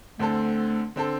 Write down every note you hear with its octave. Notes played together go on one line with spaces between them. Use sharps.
D2 D3 A3 C4 A4
D3 C4 A4